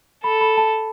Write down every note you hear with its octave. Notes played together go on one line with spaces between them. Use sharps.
A4 B5
B5
A5